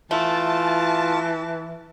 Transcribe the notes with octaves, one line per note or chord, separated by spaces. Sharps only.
E3 A3 F4 A5